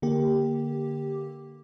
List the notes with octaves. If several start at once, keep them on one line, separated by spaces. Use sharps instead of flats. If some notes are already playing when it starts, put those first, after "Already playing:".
D3 A#3 G4